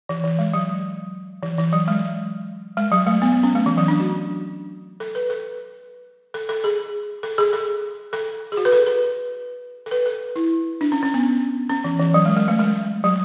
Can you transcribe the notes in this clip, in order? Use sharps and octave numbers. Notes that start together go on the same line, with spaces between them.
E3
E3
G#3
F#3
E3
E3
F#3
G#3
G#3
F#3
A3
B3
B3
C#4
A3
E3
F#3
D4
F#4
A4
B4
A4
A4
A4
G#4
A4
G#4
A4
A4
G#4
F#4
B4
A4
B4
A4
B4
A4
E4
D4
C#4
C#4
B3
C#4
E3
E3
F#3
G#3
G#3
A3
G#3
F#3